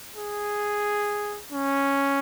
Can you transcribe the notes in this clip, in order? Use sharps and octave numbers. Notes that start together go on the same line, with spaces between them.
G#4
C#4